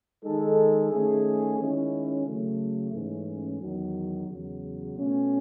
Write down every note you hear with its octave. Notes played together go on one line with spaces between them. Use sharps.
D#3 G#3 D#4 A4
D#3 A3 C#4 G#4
D#3 G#3 C#4 E4
C#3 F#3 A3
G#2 E3 A3 C#4
E2 D#3 F#3
E2 C#3 F#3
B2 A3 C#4